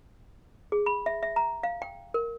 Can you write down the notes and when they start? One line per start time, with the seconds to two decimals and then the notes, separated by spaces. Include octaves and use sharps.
0.72 G#4
0.86 B5
1.06 E5
1.23 E5
1.36 A#5
1.63 F5
1.82 G5
2.14 A#4